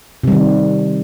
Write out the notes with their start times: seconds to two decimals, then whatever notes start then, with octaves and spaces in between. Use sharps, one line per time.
0.23 C3
0.28 G3
0.32 D#3